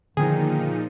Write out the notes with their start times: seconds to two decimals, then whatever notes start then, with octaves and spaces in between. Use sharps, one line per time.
0.17 A#2 D3 D#3 F3 B3 D#4 G#4